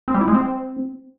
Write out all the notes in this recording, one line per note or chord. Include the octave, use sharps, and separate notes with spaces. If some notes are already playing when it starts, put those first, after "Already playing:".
C4
G3
E4
G#3
C4